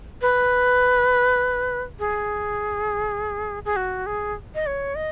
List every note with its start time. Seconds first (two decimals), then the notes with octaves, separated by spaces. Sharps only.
0.22 B4
1.99 G#4
3.65 G#4
3.76 F#4
4.06 G#4
4.55 D#5
4.66 C#5
4.95 D#5